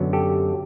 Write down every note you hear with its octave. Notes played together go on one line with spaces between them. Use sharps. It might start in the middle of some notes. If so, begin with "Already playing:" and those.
Already playing: F#2 D3 F#3 B3
G4 A4